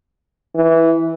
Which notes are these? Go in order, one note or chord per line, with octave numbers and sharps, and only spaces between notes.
E3